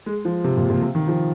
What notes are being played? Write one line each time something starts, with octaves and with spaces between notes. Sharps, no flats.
G#3
F3
C3
A#2
A#2
C3
D#3
F3